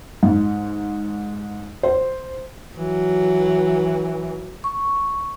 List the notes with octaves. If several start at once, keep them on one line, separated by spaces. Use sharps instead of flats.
G#2
C5
E3 F#3
C#6